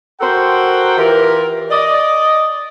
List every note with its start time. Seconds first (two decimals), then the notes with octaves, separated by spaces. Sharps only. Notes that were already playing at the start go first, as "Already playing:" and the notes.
0.21 F#4 A4 A#4 C5 F#5 G5
0.97 E3 F4 G4 A#4
1.70 D5 D#5